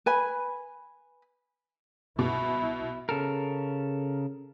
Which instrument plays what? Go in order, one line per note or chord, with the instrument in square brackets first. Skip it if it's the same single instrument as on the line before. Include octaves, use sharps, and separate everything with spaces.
[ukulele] B4 G#5 B5
[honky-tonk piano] B2 [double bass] E4
[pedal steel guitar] C#3 A4 A#4